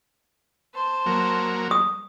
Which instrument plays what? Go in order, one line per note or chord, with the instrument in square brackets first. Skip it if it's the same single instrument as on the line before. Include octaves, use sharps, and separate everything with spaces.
[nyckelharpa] C5 A5
[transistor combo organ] F#3 A#3
[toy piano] D#6